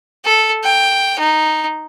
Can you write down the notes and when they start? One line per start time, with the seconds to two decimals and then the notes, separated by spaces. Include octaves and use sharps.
0.25 A4
0.64 G5
1.19 D#4